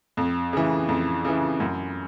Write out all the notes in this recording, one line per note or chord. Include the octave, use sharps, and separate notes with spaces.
F2
C#3 E3
F2
C#3 E3
F#2